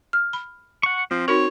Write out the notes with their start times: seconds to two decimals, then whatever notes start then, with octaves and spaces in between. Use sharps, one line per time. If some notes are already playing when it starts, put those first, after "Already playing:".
0.13 F6
0.33 B5
0.83 F#5 C#6
1.11 F3 C4
1.28 D#4 F#4 A#4 C#5